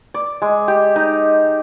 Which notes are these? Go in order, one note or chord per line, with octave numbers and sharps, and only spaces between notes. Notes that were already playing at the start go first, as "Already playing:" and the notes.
D5
G#3
G4
D#4